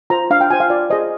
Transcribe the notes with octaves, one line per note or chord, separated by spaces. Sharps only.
F4 C5 A#5
D4 F5
G5
F4 C5 G#5
F5
F4 D5
G#4 C5 D#5